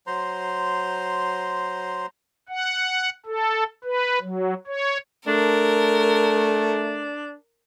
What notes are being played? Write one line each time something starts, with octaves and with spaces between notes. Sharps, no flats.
F#3 C5 A#5 C6
F#5
A4
B4
F#3
C#5
A3 D4 A#4